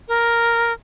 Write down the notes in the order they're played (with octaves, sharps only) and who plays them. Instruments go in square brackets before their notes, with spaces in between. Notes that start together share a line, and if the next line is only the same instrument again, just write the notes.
[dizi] A#4